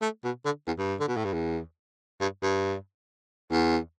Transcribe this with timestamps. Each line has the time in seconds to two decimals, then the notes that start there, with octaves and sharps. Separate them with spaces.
0.02 A3
0.24 B2
0.45 D3
0.67 E2
0.78 G2
1.00 D3
1.08 B2
1.17 A2
1.25 G2
1.33 E2
2.20 G2
2.42 G2
3.51 E2